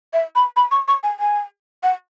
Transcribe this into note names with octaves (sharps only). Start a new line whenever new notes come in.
E5
B5
B5
C#6
C#6
G#5
G#5
F#5